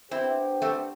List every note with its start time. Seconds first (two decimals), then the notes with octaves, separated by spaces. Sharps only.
0.11 B3 C4 D4 E4 G4 C5
0.62 A3 C4